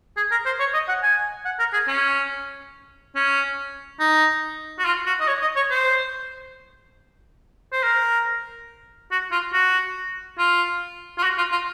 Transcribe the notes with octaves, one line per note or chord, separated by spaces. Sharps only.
G#4
A#4
C5
C#5
D#5
F#5
G#5
F#5
A#4
G#4
C#4
C#4
D#4
F#4
F4
F#4
D#5
C#5
D#5
C#5
C5
C5
A#4
F#4
F4
F#4
F4
F4
F#4
F4
F4